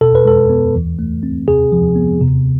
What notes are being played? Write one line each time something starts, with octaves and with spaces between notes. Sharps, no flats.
B2 A4
B4
G#3 A4
B3
E3
A3
C4
C3 G#4
F3
B3
C3